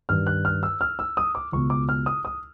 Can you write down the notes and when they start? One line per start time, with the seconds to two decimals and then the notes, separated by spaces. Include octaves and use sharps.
0.09 G2 D#3 F6
0.27 F#6
0.45 F6
0.63 E6
0.81 F6
0.99 E6
1.17 D#6
1.35 D6
1.52 C#2 B2 C#6
1.70 D6
1.89 F6
2.06 D#6
2.25 D#6